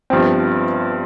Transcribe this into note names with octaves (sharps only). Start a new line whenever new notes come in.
G1 G2 F3 C4